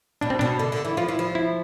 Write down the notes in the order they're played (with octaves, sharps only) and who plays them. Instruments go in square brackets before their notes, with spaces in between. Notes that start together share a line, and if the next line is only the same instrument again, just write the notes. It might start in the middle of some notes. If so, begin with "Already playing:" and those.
[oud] B2 [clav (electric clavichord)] D4
[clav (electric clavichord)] C4
[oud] B2 [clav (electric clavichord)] D4
[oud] D3
D3
E3
[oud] F3 [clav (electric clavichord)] F4
[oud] E3
F3
[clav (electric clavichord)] E4